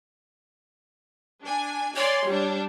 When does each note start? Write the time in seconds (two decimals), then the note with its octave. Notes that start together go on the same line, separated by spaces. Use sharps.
1.45 D4 G#5
1.96 C#5 D5 G#5 C6
2.29 G3 D4